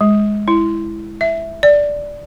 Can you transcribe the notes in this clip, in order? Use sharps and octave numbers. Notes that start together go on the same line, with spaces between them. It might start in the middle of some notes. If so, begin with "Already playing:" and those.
G#3
E4
E5
D5